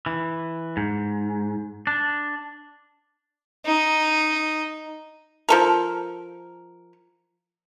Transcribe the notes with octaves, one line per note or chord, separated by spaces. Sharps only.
E3
G#2
D4
D#4
F3 A4 A#4